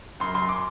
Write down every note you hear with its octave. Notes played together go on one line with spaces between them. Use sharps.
F#2 C6
F#2 C6
D6